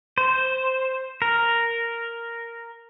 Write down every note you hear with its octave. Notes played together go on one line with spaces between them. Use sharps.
C5
A#4